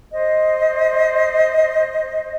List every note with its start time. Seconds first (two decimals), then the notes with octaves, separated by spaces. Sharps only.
0.12 C5 D#5